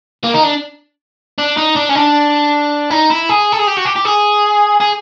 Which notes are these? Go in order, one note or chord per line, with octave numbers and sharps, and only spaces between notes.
A#3
D#4
D4
D4
D#4
D4
C#4
D4
D#4
E4
G#4
A4
G#4
G4
F#4
G4
G4
G#4
G#4